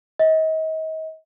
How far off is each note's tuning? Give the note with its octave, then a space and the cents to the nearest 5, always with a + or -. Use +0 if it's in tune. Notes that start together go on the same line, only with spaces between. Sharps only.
D#5 +35